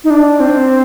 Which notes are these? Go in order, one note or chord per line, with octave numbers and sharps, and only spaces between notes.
D#4
D4
C4